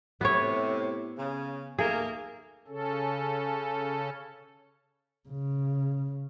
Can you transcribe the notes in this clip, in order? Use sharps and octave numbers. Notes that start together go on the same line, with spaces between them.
A2 C3 B3 C#5
C#3
D#2 A3 A#3 G#4
C#3 C#4 A4
C#3